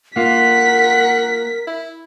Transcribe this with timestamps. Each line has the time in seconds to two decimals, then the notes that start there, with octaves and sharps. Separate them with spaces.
0.16 A#3 F4 A#4 F#5 B6
1.67 E4